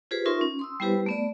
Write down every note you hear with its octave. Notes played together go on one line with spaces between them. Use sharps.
F4 G4 G#4 B4 C5
D#4 F4 A#4 E5 C6 C#6
C#4
C6 D#6 E6
G3 B3 E4 G4 B4 C5
A3 B3 D5